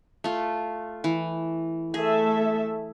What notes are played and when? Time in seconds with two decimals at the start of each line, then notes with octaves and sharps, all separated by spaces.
0.24 A3 F4
1.04 E3
1.94 A3 G#4 A4 E5